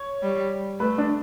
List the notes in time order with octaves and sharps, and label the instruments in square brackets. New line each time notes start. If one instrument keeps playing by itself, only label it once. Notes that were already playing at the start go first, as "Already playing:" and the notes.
Already playing: [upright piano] C#5
[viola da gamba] G3
[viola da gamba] A3 [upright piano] B4
[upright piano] D4